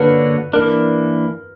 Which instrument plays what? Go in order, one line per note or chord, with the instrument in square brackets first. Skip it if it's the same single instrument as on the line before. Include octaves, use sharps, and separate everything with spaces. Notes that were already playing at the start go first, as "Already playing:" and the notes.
Already playing: [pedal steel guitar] D3 A#3 D4 F#4 C#5 [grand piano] B4
[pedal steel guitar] E3 A#3 D4 [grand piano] A#4